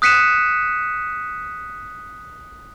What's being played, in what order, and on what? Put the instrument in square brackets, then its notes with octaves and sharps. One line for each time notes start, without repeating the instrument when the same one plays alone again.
[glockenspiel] D#6 F#6 B6 C#7 D#7 E7